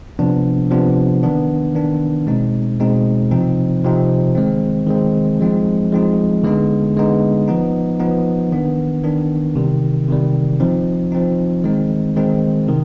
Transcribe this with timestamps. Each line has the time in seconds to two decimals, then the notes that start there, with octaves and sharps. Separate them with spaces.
0.19 C3 F3 B3 D4
0.71 C3 F3 B3 D4
1.23 D#3 B3 D4
1.75 D#3 B3 D4
2.27 B2 G#3 C4 D#4
2.79 B2 G#3 C4 D#4
3.31 C3 F3 C4 D#4
3.84 C3 F3 C4 D#4
4.35 D#3 G#3 C4
4.87 D#3 G#3 C4
5.40 F3 G#3 C4 D#4
5.92 F3 G#3 C4 D#4
6.44 D3 G#3 B3 D#4
6.96 D3 G#3 B3 D#4
7.48 F3 B3 D#4
7.99 F3 B3 D#4
8.52 D#3 B3 D4
9.04 D#3 B3 D4
9.55 C3 D#3 G3
10.08 C3 D#3 G3
10.60 F3 C4 D#4
11.12 F3 C4 D#4
11.64 D#3 G#3 C4 D#4
12.17 D#3 G#3 C4 D#4
12.68 C3 D#3